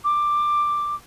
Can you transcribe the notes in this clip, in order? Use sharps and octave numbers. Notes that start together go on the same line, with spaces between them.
D6